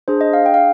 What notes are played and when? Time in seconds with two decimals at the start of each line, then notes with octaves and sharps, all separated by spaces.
0.08 D4 G#4 C5
0.21 D#5
0.33 F5
0.46 G5
0.54 F5